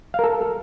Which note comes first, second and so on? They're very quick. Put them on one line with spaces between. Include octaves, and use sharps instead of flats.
F5 A#4 A4